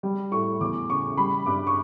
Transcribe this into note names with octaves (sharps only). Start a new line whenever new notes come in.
G3
A2 C#6
E2 D6
C#3 C#6
G3 B5
G2 D6
C#6